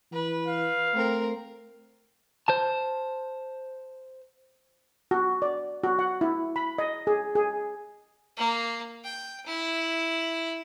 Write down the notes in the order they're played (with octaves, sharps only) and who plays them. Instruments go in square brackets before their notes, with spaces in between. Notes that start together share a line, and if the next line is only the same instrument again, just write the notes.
[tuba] E3 [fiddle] B4
[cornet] F5
[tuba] A3 [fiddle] C4 A#4
[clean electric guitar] C5 A5
[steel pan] F#4
D5
F#4
F#5
E4
B5
D#5
G#4
G#4
[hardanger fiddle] A#3
G5
E4